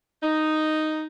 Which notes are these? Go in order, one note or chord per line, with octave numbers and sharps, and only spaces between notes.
D#4